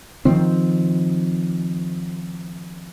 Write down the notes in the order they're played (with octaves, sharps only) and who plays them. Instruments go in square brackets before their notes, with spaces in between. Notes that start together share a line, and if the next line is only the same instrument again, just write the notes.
[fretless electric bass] D#3 F3 C4